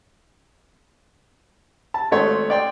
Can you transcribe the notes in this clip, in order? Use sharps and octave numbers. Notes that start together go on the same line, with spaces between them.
A5
G#1 A3 C#5 C6
D5 G5 C6